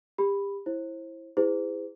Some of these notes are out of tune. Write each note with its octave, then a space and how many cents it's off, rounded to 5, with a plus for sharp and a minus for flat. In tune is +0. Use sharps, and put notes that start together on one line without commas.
G4 +30 B5 +0
E4 +0 C5 +30
E4 +0 G#4 -30 C5 -45